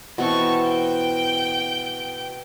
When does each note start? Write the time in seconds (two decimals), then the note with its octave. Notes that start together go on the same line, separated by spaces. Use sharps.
0.18 B2 E3 C4 A5 C#6
0.68 G5